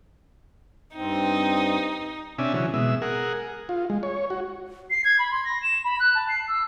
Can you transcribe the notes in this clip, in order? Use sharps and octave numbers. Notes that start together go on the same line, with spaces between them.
G2 C4 D#4
C3 C#4 D4 E5 G#5
C#3 E3 F#3
B2 G#3 E5
G#4 A#4 F#5
F4
G#3
C#5
F#4
C7
G#6
B5
C6
A#6
E7
B5
F#6
A5
C7
E6